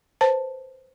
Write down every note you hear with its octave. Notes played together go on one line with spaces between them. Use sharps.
B4 C5 A5